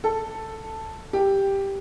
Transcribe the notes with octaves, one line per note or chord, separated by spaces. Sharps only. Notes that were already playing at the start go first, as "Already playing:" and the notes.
A4
G4